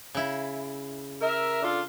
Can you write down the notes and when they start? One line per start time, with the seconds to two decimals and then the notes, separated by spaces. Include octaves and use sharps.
0.15 C#3 E4
1.22 A#4 E5
1.63 D4 F4 A4